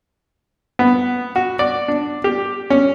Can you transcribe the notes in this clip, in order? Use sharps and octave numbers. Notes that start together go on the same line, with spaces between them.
B3
F#4
D5
D4
G4
C#4